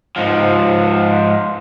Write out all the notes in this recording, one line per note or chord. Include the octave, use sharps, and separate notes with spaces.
G#2 F3